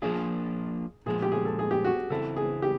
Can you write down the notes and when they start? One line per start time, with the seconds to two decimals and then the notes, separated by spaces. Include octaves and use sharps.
0.02 F3 A#3 D4 F4 G#4
1.06 A#2 F3 G#3 G#4
1.22 G4
1.32 G#4
1.45 A4
1.59 G#4
1.71 G4
1.85 F#4
2.10 C#3 E3 C4 E4 A4
2.36 G#4
2.62 G4